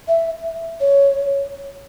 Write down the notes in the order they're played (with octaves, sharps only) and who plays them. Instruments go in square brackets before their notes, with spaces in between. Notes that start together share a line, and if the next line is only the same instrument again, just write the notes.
[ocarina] E5
C#5